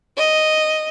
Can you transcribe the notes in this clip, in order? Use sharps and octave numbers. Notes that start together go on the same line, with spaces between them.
D#5